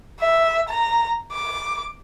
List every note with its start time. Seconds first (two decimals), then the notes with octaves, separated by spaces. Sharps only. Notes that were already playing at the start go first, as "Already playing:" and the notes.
0.20 E5
0.68 A#5
1.32 D6